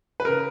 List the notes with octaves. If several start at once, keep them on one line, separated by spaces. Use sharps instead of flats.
B4
C#3 A#4